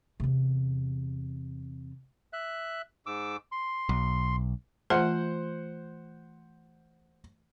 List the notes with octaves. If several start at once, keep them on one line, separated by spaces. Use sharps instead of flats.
E2 C3
E5 F#6
G#2 D6 E6
C6
B1
E3 A3 F4 C5 F#5 C6